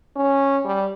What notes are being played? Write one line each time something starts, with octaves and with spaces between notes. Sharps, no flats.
C#4
G3